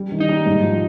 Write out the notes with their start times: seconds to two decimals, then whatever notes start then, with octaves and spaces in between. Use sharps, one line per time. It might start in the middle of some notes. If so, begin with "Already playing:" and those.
Already playing: G3
0.12 D#3
0.20 D#4
0.29 G3
0.46 G#2
0.63 F3